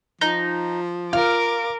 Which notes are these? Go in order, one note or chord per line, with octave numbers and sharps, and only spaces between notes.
F3 D#4
F4 A#4 D6 F6